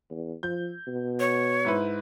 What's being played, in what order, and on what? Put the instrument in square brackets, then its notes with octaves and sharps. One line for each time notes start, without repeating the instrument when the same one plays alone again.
[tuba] E2
[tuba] F3 [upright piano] G6
[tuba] B2
[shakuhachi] C#5
[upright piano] G#2 E4 B4